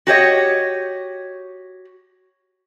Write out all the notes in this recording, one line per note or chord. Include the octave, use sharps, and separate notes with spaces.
F#4 G4 C#5 D#5